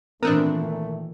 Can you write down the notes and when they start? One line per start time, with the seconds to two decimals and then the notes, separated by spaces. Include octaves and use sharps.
0.23 A#2 D#3 E3 A3 B3 C4 D4 A#4